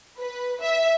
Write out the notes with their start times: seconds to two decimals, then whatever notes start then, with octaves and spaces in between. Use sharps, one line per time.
0.19 B4
0.61 E5